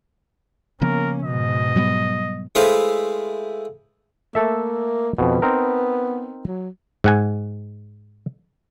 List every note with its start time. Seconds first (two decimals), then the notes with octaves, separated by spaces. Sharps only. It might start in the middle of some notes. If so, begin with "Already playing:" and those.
0.81 C#3 F3 A#3 B3 C#4 A#4
1.24 G#2 B2 D#5
1.76 F#3 G3 B3
2.55 G#3 A3 E4 B4 C5 F5
4.35 A3 A#3 A4 E5
5.18 F2 B2 B3
5.42 C4 D#4 A#4
6.47 F#3
7.04 G#2 F#5 G#5